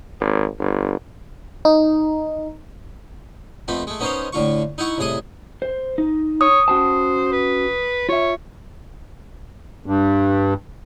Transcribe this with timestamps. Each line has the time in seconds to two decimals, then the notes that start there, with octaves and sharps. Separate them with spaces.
0.21 G#1
0.59 G1
1.65 D#4
3.68 F2 A3 B3 C4
3.87 G#3 A3
4.00 B3 C#4 D#4 A#4 C5 C#5
4.33 A2 D3 F4 C#6
4.78 D#4 E4 F#5 C#6
4.98 C2 A2 G#4 D#5
5.62 C5
5.98 D#4
6.41 C#5 D#6
6.68 C#4 F#4 C5 A5
7.32 B4
8.09 F4 C#5 E5
9.86 G2